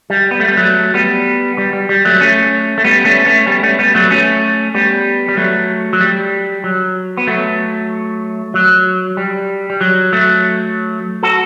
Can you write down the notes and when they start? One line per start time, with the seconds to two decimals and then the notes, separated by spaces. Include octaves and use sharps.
0.10 G3
0.31 B3
0.40 A3
0.48 G3
0.57 F#3 A3
0.94 G3 B3
1.58 G3
1.73 G3
1.89 G3
2.05 F#3 A3
2.21 A3 C#4
2.78 A3
2.84 G3 B3
3.05 A3 C#4
3.26 A3 C#4
3.47 G3 B3
3.63 A3 C#4
3.79 G3 B3
3.95 F#3 A3
4.11 A3 C#4
4.75 G3 B3
5.29 G3
5.37 F#3 A3
5.93 F#3
6.01 G3
6.64 F#3
7.18 B3
7.27 F#3 A3
8.54 F#3
9.17 G3
9.70 G3
9.81 F#3
10.13 F#3 A3
11.23 F#4 A4